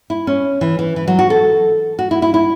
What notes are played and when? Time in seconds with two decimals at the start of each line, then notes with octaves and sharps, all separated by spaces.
0.10 E4
0.27 C#4
0.61 E3
0.79 E3
0.96 E3
1.08 F#3
1.19 F#4
1.30 A4
1.99 F#4
2.11 E4
2.22 E4
2.34 E4